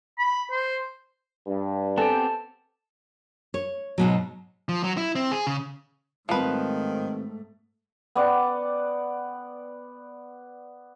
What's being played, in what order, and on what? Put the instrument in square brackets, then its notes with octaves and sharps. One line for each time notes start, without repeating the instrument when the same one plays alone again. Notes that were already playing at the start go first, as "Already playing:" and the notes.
[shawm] B5
C5
[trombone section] G2
[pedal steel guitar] B3 C4 G4 [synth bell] A4 G#5 [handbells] A5
[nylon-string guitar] C#5
G#2 B2 F#3
[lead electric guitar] F3
F#3
E4
C4
G#4
C#3
[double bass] G#2 A3 [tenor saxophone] D#3 [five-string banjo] F3 B4 [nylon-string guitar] G3 B3 C4
[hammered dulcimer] B3 D5 F#5 G5